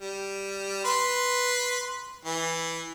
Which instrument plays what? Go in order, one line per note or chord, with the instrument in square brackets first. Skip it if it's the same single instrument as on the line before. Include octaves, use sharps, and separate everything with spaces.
[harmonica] G3
B4 C6
E3